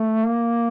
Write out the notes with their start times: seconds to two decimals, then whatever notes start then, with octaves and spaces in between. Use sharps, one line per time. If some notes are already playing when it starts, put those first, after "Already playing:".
Already playing: A3
0.26 A#3